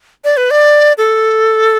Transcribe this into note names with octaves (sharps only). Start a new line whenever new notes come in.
D5
B4
D5
A4